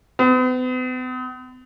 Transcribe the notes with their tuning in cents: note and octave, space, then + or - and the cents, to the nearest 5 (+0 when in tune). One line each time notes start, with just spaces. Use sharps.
B3 +45